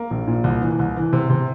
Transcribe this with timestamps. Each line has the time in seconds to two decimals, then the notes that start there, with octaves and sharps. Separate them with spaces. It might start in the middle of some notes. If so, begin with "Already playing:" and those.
Already playing: A#3
0.11 A#1
0.27 A#2
0.44 C2
0.61 E3
0.79 C2
0.96 E3
1.13 C3
1.30 C3